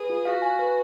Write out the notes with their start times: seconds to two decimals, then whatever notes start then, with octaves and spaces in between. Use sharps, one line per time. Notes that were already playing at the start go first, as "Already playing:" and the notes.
Already playing: G#4 B4
0.10 F4
0.25 F#4 F5
0.42 G#5
0.59 B4